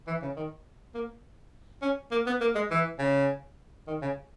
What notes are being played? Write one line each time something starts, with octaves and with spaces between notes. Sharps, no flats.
E3
C#3
D#3
A#3
C#4
A#3
B3
A#3
G#3
E3
C#3
D#3
C#3